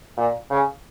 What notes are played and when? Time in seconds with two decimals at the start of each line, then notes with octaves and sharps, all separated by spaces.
0.17 A#2
0.50 C#3